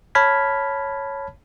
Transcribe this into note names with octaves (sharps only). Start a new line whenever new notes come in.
C#5 A5 B5 F6 G#6 B6